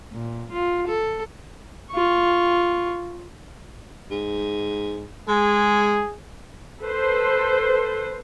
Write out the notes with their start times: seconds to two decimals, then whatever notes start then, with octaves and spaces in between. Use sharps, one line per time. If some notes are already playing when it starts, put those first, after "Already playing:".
0.12 A#2
0.52 F4
0.88 A4
1.91 F4 C#6
4.11 G#2
5.28 G#3 G#4
6.82 A4 B4 C5